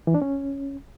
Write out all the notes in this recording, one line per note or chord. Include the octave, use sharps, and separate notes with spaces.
E3
D4
C#4